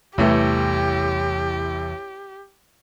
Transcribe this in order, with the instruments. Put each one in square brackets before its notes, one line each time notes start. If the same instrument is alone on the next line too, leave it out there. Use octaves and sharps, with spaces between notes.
[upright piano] A1 E3 A3 [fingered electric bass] E2 C3 G3 [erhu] G4